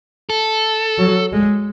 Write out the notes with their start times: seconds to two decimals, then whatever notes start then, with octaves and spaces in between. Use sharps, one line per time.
0.30 A4
0.98 F#3
1.32 G#3